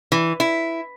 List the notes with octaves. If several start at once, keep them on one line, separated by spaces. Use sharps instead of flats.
E3
E4